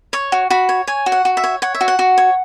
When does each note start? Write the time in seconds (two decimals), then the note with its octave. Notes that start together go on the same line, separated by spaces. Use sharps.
0.13 C#5 C#6
0.32 F#4
0.50 F#4 B5
0.69 C#5
0.87 C#5 G#5
1.06 F#4
1.12 F#5
1.25 F#4
1.37 E5
1.44 C#5
1.62 C#5 F#5
1.75 E5
1.81 F#4
1.88 F#5
1.99 F#4
2.18 C#5